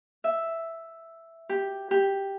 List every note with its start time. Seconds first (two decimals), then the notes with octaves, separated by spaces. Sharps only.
0.24 E5
1.49 G4
1.91 G4